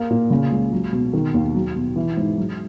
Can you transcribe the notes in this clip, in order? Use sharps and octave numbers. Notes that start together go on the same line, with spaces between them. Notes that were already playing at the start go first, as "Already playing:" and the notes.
Already playing: A#3
A#2
C#3
C#2
F#3
B2
D#3
D#2
F#3
B2
E3
G#2
F#3